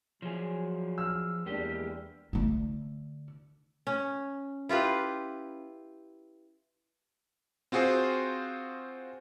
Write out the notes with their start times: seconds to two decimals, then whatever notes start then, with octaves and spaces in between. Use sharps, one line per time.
0.22 F3 F#3 G#4
0.98 E6 F6
1.46 E2 G#3 A#3 D4 G4
2.33 D3 A3
3.87 C#4
4.69 E4 F4 G4 B4
7.72 C4 F4 F#4 G#4 C5